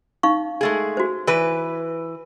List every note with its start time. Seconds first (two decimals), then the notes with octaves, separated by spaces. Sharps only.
0.23 D#4 F5 C#6
0.61 G#3 A3 G#4
0.97 F#4 C5
1.27 E3 B4